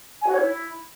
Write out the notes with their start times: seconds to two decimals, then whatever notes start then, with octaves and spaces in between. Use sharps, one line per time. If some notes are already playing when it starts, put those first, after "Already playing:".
0.22 G#5
0.28 F#4
0.34 C#5
0.39 E4